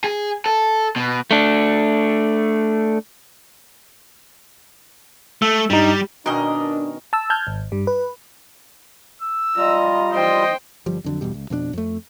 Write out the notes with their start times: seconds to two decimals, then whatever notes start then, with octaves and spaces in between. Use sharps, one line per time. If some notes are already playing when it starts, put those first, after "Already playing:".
0.04 G#4
0.46 A4
0.96 B2
1.31 A3 D4
5.42 A3 E6
5.70 G2 G3 D#4
6.26 B2 D#3 C#4 D4 A#4 D#5
7.13 A5 E6
7.30 A5 F6 G6 G#6
7.47 G#1
7.72 G2 G3
7.87 B4
9.22 E6
9.57 G3 F4 D#5 A#5
10.12 C5 D#5 G5
10.86 G1 F3 G3
11.04 F2 D3 F#3
11.21 G1 E2 B2 G3
11.34 C#2
11.50 F2 B2 A3 D4
11.73 F2 A3